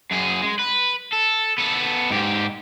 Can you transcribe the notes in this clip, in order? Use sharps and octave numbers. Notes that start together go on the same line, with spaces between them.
F#2 G#4
G#3
B4
A4
B3 A4
G#2 G4